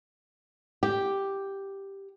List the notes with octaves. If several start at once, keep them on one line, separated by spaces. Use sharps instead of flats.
G4